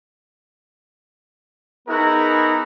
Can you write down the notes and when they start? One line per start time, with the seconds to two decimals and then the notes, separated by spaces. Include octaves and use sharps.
1.88 B3 D#4 E4 F#4 G#4 A#4